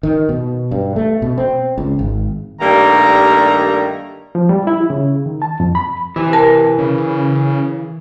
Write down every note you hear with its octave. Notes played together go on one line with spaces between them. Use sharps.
D#3
B2
G2
A3
B2
C4
C#2
G#1
G2 D#3 G3 A3 A#3 A#5
F3
G3
E4
C#3
D#3
A5
F2
B5
C3 E3
A#4 A5
C#3